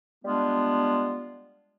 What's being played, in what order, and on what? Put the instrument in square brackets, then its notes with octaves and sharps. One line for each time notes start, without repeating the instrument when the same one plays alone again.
[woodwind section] G3 G#3 B3 D4 F4